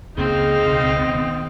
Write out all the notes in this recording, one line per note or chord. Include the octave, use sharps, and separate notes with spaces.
C#2 A#3 C4 C#4 D#4 G#4 F5
C#2 B2
D#3 B3